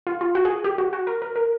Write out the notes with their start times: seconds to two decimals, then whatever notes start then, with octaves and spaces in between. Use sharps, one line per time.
0.07 F4
0.21 F4
0.35 F#4
0.45 G#4
0.64 G4
0.78 F#4
0.93 F#4
1.07 A#4
1.22 A#4
1.36 A#4